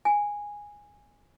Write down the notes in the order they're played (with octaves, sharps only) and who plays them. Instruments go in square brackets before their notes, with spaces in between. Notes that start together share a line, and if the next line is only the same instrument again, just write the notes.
[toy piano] G#5